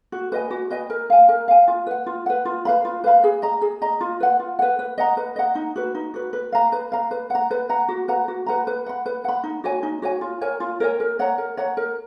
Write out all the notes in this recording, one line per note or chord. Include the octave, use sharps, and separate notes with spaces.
F#4
B4 D#5 G#5
F#4
B4 D#5 G#5
A#4
F5 G#5
A#4
F5 G#5
F4
B4 F#5
F4
B4 F#5
F4
B4 F5 B5
F4
B4 F5 B5
G#4
D#5 A#5
G#4
D#5 A#5
F4
B4 F#5
F4
B4 F#5
B4
D#5 F#5 A#5
B4
D#5 F#5 A#5
D#4
F#4 B4
D#4
F#4 B4
B4
F5 A#5
B4
F5 A#5
B4
F#5 A#5
B4
F#5 A#5
F#4
B4 F#5 A#5
F#4
B4 F#5 A#5
B4
F#5 B5
B4
F#5 B5
D#4
F#4 C#5 G#5
D#4
F#4 C#5 G#5
F4
A#4 C#5 G#5
F4
A#4 C#5 G#5
A#4
C#5 F#5 A#5
A#4
C#5 F#5 A#5
A#4